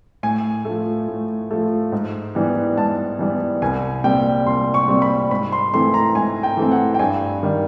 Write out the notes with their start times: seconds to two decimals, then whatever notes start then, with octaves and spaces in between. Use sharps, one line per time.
0.23 A2 G#5
0.65 F3 A3
1.08 A2
1.51 F3 A3
1.92 G#2
2.35 E3 G3 B3
2.78 G#2 A5
3.19 E3 G3 B3
3.62 C2 G#5
4.04 A#2 G3 C4 G5
4.46 C2 C6
4.74 C#6
4.88 A#2 G3 C4
5.02 B5
5.31 G#2 B5
5.52 C6
5.73 E3 A3 C4 C6
5.94 A#5
6.15 G#2 G#5
6.43 G5
6.57 E3 A3 C4
6.71 F#5
6.94 G5
6.99 G2 G#5
7.43 D#3 G3